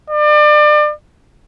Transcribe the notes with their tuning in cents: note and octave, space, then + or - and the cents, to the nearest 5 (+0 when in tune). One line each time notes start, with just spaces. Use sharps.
D5 +35